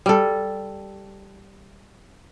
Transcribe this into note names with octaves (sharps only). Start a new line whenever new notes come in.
G3 A4